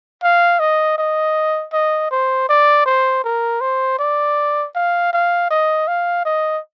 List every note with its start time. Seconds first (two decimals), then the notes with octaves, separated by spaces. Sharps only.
0.23 F5
0.59 D#5
0.98 D#5
1.73 D#5
2.11 C5
2.49 D5
2.86 C5
3.24 A#4
3.61 C5
3.99 D5
4.75 F5
5.13 F5
5.50 D#5
5.88 F5
6.25 D#5